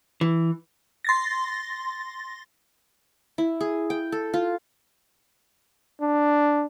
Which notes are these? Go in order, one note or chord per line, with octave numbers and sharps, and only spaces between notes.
E3
C6 A6 A#6
E4
G#4
G5
A4
F4
D4